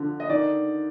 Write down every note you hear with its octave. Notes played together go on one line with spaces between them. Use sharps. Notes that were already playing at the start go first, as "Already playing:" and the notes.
Already playing: D3 F3
D#5
D#3 D5